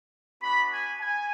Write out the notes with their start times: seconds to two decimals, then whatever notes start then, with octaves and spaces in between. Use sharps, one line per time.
0.42 B3 D4 F#4 B5
0.71 G#5
1.00 G#5